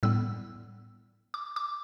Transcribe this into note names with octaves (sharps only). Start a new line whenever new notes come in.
A2 G3 B3 E6
D6
D6